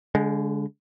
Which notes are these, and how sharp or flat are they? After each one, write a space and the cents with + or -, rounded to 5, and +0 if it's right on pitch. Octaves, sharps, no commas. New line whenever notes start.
D3 -35 G#3 +0